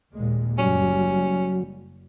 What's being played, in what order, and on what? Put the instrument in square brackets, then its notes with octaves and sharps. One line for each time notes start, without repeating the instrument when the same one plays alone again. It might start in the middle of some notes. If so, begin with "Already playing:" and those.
[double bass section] D#2 A#2 G#3
[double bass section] F#1 F#2 G3 [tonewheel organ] F#3 [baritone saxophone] C#4